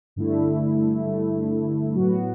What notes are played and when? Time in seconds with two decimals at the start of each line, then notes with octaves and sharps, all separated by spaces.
0.16 G2 D3 A3 E4
1.05 G2 D3 A3 E4
1.95 A2 F#3 B3 F#4